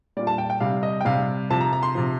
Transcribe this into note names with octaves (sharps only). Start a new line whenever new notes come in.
A#2 G3 D5
A5
G5
G5
C3 G3 F5
D#5
G5
C3 G3 F5
C3 F3 A5
A#5
A#5
C6
C3 F3